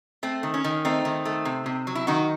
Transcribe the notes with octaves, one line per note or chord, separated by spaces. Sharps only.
A3 C4
D#3
C#4
D#3
A3 C4 D#4
D#3
A3
C3
C3
F#3
E4
D#3 D#4 F#4